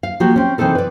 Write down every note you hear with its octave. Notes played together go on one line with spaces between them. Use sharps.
F5
F3 A#3 F#4 G4
C4 C#4
C3 E3 C4 D#4 A4 A#4
B4 D5